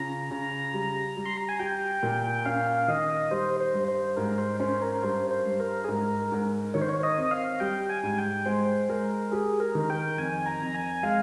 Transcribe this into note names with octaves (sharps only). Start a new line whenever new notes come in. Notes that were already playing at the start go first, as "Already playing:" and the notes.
Already playing: C#3 F4 A#5
C#3
G3
G3
C6
A#5
G#5
G4 G5
A#2
C#4 F5
D#3 D#5
G3 C5
C5
G2
C5
G#2 A#4
C5
C#4 C5
A#4
G2 C5
C5
G2
A#4
G#4
G#2 A#4
G#2
D#3 C#5
C5
C#5
D#5
C4
F5
G3 G5
G#5
G#2
G5
G#3 C5
G#3 A#4
G4 G#4
A#4
D#3
G5
F2 G#5
A#5
F2
G#5
G#3 F5